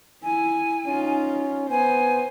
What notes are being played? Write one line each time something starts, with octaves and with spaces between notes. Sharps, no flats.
E4 G#5
C#4 D#4 F4
B3 C5 G#5